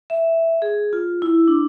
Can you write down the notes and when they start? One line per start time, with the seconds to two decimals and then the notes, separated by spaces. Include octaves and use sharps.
0.10 E5
0.62 G#4
0.93 F4
1.22 E4
1.48 D4